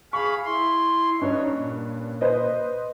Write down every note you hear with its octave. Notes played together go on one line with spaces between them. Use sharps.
G#4 F5 B5 C#6
E4 C6
G2 C#4 D#4 C#5
A#2
B4 C5 D#5